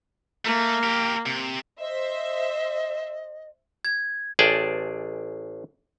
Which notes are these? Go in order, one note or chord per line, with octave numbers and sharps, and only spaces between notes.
A3 A#3
G4 A#4
C3
C5 D#5 E5
G#6
A1 G#4 D5 E5 G5 A5